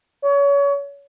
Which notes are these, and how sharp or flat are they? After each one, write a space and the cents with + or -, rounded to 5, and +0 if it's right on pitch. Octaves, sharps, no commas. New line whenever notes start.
C#5 +30